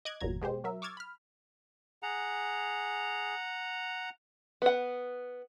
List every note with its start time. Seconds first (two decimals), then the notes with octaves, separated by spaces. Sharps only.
0.05 D#5 D6 F#6 G#6
0.20 G1 E2 A#2 F#3 A#5 G#6
0.41 B2 G#3 G4 C5
0.64 F#3 A#4 E5
0.82 C#6 D6 E6 F6 G#6 A6
0.97 B5 F6
2.03 G#4 F#5 A#5
4.62 B3 F#5